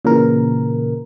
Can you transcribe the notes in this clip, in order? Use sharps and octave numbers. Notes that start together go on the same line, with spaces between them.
A#2 C#3 E3 A#4